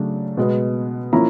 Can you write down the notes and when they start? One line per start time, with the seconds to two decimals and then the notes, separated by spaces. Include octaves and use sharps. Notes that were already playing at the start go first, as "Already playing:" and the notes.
Already playing: C#3 F#3 A3 D4
0.37 B2 G#3 B3
1.13 F3 A#3 C#4 E4 A#5